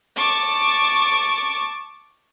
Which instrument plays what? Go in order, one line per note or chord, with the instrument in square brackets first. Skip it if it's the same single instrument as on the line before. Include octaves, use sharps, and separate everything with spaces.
[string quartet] A5 C#6 D6